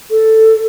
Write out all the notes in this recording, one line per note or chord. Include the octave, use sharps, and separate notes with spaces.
A4